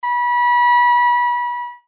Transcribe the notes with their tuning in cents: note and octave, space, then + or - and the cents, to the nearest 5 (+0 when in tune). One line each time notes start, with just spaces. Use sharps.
B5 -30